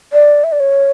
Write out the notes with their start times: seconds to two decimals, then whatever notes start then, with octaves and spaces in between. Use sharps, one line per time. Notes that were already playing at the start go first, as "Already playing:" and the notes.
0.13 D5
0.44 E5
0.52 D5
0.60 C#5